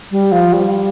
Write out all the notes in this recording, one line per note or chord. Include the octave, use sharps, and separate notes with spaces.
G3
F3
G3